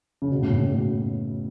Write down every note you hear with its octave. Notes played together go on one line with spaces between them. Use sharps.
C#3
B2
A2 C#3
A2 C#3
B2
A2